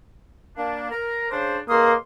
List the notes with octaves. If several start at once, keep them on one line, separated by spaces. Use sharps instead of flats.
A#3 D4
A#4
C#3 D4 C5
C#2 A#3 C6 D#6